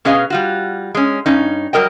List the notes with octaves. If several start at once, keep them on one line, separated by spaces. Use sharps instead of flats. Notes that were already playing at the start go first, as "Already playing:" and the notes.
B2 C#4 G#4 B4 D#5 F5
G3 F4 F#4
G#3 C#4
G2 C#4 D#4
F#3 G3 A#4 D#5 G5